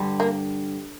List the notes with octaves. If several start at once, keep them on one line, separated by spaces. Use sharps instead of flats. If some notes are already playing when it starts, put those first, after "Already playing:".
Already playing: G2 D3 G3
A#3